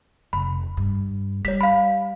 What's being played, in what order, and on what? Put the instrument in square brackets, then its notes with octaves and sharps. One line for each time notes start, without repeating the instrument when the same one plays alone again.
[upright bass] F1 [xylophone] B5
[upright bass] G2
[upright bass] G3 [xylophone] C#5 B6
[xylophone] F5 B5